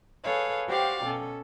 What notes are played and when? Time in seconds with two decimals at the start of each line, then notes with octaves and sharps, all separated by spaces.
0.24 G#4 A4 B4 C#5 F5
0.67 F#4 G4 C5 D5 F5 G5
1.04 B2 C#4 A4